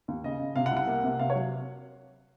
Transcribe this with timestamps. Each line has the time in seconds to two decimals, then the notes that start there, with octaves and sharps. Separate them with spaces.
0.08 D#2
0.24 C#3 D#5
0.40 C#3
0.56 C3 F5
0.66 F#5
0.71 C2
0.77 F#5
0.87 A#3
1.04 C3
1.19 C3 F5
1.30 C#5
1.35 F#3